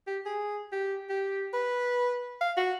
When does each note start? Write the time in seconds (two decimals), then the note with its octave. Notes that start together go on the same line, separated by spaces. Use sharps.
0.07 G4
0.26 G#4
0.72 G4
1.10 G4
1.53 B4
2.41 F5
2.57 F#4